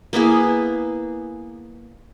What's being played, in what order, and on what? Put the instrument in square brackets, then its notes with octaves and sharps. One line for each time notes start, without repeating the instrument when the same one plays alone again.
[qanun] A#3 B3 E4 G#4